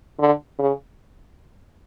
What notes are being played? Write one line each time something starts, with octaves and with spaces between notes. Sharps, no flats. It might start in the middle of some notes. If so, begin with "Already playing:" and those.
D3
C#3